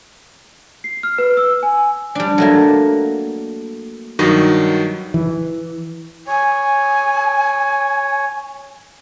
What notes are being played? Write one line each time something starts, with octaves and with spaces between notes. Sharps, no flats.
C7
F6
B4
E6
G#5
G3 D4
F#3 A3 A#3
G2 D#3 F#3 D#5
E3
C#5 G#5